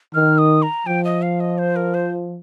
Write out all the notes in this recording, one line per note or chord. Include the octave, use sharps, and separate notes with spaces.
D#3 F6
D#6
A#5
F3 G5
D#5
F5
D#5
C5
A#4
C5